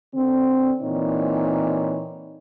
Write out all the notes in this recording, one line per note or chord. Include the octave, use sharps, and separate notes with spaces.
D3 C4
A#2 E3 C4 D#4 C#5